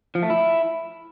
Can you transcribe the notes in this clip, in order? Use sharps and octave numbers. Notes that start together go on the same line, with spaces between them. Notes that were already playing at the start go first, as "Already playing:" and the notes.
F3
A3
E4